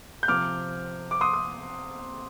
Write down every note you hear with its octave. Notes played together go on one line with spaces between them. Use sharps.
G6
C3 F3 C4 D6 F6
D6
C6 D#6
D#6